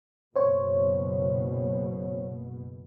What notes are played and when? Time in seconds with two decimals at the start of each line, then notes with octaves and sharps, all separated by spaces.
0.36 F#1 B2 C5 C#5